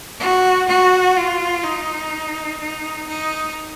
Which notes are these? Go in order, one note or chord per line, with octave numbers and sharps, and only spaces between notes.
F#4
F#4
F4
D#4
D#4
D#4